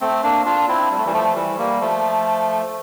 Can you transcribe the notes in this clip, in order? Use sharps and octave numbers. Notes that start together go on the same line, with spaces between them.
A3 C4
A#3 D4
D4 F4
C4 E4
G3
A3
E3 G3
F3 A3
E3 G3
G3 A#3
F3 A3